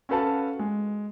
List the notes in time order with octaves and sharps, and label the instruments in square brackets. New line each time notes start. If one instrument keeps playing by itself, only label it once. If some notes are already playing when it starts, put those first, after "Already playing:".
[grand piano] C#4 F#4 A4 B4 F5 A5
G#3